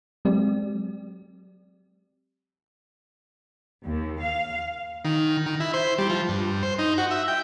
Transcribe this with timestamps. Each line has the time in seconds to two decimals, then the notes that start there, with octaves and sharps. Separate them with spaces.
0.25 F#3 G#3 C4 G4 D5
3.85 D#2
4.21 F5
5.05 D#3
5.46 D#3
5.60 E4
5.74 C5
5.98 G3
6.09 F3
6.29 G2
6.63 C5
6.79 D#4
6.98 F#4
7.11 E5
7.28 G5